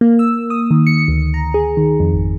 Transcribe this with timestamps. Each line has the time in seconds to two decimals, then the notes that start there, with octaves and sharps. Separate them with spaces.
0.01 A#3
0.19 E6
0.50 D#6
0.71 D#3
0.87 C#7
1.08 D2
1.34 A#5
1.54 G#4
1.77 D#3
2.00 F2
2.13 G#1